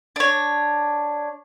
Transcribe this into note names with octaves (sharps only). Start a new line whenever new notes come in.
D4 C#5